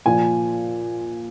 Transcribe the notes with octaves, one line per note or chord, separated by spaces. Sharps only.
A#2 F3 G#5